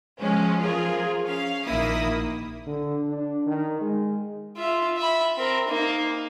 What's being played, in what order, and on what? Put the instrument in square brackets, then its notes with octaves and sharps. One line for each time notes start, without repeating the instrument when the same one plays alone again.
[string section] F3 G#3 C#4
F3 F4 G#4 A#4
C#4 F5
A#1 D#3 A#3 E4 D#6
[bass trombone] D3
D4
D#3
G#3
[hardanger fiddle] F4 E5
E5 B5
C4 A#4
A#3 D#4